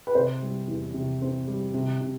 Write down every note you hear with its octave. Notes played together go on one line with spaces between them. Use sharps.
B4
C3 C5
G3
E2
C3
C4
G3
C3
C3